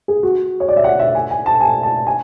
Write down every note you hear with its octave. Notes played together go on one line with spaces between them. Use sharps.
G#4
F#4
C#5
D5
E5
F#5
E5
G#5
G#5
A5
G#5
A5
G#5